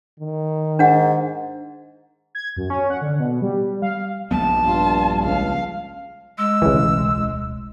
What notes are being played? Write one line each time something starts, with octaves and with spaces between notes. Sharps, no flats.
D#3
G#2 D4 F#5
G#6
F#2
C#4
F#5
D3
B2
G3
F5
A#1 G3 B3 A5
G2 F4
C#2 F5
G#3 E6
D1 B1 C#3 E3